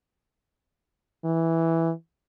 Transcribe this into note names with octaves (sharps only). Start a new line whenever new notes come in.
E3